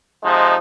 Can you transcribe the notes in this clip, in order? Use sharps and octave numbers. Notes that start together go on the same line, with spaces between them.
C3 F3 G#3 D#4